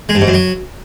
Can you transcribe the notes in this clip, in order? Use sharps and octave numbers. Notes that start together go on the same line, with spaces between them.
G#3
G2
G#2
F#2
F#3